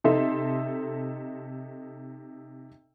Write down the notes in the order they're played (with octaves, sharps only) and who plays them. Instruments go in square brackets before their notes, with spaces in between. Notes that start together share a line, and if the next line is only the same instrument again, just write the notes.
[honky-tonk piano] C3 D#4 A4 E5 C6